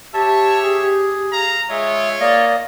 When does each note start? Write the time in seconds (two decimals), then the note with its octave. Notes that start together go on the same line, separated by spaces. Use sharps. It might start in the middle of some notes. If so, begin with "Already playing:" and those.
0.14 G4 C#5 E5 A5
0.63 G#4
1.32 F5 A#5
1.70 G#3 F4 C#5 E5
2.20 A#3 D5 D#5